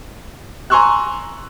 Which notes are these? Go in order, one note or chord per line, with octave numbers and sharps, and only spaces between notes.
G#5 A#5 C6 C#6 E6 F#6